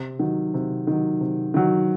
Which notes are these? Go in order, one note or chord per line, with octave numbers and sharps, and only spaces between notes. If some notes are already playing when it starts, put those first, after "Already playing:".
Already playing: C3
D#3 F#3
C3
D#3 F#3
C3
D#3 F#3